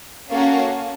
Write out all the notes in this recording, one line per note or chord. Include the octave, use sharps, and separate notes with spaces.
A#3 C#4 F#4 A4 F5